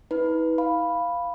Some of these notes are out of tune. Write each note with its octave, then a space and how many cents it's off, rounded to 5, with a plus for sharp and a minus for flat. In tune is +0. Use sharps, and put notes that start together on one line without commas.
E4 -45 B4 +0
F5 +0 B5 +0